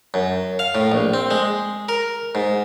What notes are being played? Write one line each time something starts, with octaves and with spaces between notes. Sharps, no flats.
F#2
F5
A2
A#1
C4
G#3
A#4
G#2